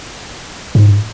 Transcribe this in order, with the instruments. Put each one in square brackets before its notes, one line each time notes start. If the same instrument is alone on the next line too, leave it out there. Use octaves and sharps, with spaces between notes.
[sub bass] G#2